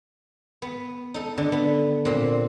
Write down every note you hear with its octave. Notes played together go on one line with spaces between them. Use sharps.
B3
D#4 A4
D3
B3
A#2 C4